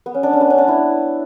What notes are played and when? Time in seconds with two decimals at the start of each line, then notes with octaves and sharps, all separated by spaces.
0.06 B3
0.14 C#4
0.23 D4
0.33 C#4
0.41 B3
0.50 C#4
0.58 D4
0.68 E4